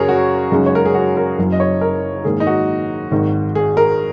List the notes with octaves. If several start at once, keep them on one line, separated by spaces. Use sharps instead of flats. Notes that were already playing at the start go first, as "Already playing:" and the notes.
Already playing: F#2 C#3 F#3 C#4 G#4 A#4 C#5
F#4
F#2 C#3 G#3 D#4
C#5
A#4
G#4
F#4
A#4
F#1 F#2 F#3
D#5
C#5
A#4
G#2 D#3 A#3 G#4
D#4
F#4
G#1 G#2 D#3
G#4
A#4